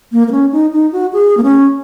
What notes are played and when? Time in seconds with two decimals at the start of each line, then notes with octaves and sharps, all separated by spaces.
0.12 A#3
0.27 A#3
0.32 C#4
0.52 D#4
0.73 D#4
0.92 F#4
1.13 G#4
1.37 A#3
1.43 C#4